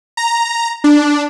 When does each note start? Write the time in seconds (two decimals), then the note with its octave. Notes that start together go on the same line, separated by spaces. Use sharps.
0.17 A#5
0.84 D4